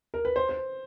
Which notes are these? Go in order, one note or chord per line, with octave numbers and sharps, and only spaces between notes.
A#4
B4
C5
C5